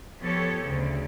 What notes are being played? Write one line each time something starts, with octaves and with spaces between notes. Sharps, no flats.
F3 B3 G4 A4 C#5
D2 C#3